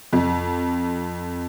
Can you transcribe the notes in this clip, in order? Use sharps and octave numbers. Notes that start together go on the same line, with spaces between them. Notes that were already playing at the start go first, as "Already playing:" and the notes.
F2